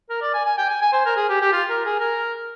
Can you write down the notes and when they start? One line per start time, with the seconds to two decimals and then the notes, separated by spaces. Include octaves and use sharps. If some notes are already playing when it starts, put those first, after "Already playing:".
0.10 A#4
0.22 D5
0.33 G#5
0.45 G#5
0.58 G5
0.69 G#5
0.82 G#5
0.93 C5
1.06 A#4
1.16 G#4
1.29 G4
1.41 G4
1.52 F4
1.69 A#4
1.85 G#4
2.00 A#4